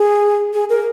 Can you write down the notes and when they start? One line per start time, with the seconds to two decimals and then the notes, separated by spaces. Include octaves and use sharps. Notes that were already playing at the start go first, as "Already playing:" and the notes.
Already playing: G#4
0.54 G#4
0.69 A#4